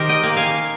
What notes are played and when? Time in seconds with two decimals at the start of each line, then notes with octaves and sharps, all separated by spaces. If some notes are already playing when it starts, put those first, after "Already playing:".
Already playing: D#3 G4 A#4 C5
0.09 D#5 G5
0.23 A#3
0.37 F5 G#5